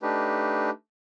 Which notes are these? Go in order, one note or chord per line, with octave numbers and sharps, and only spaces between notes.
A3 D4 D#4 G4 B4